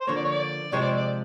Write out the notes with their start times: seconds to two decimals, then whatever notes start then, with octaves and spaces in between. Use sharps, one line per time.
0.01 C5
0.07 D3 F3 A#3 C#5
0.16 D5
0.24 C#5
0.31 D5
0.72 C3 F3 G#3 C4 C#5
0.81 D5
0.97 D5